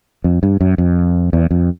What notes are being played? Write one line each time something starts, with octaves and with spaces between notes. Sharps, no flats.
F2
G2
F#2
F2
E2
F2